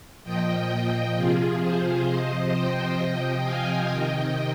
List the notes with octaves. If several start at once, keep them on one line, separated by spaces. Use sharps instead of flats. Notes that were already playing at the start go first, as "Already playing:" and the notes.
A#2 F3 D#5 G5
C3 F3 F4 G#4
G#4 C5
C3 F3 C5 D#5
D#5 G5
C3 F3
F5 G#5
C3 D#3 D#5 G5